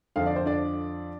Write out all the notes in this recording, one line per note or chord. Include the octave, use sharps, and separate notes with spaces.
F2 D3 F3 F5
D5
C5
D4 D5